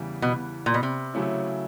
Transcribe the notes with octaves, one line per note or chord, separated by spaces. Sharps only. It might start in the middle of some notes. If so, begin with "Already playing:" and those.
Already playing: E2 C#3 E3 G3 B3
B2
A#2
B2
C3
C#3 F#3 A3 C#4 E4